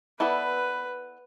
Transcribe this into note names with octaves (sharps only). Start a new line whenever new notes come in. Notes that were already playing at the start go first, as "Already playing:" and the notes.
B3 E4 A4 B4 D5